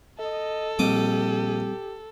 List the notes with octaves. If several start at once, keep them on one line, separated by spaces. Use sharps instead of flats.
A4 D#5
A#1 G3 C4 G4 D#5 D6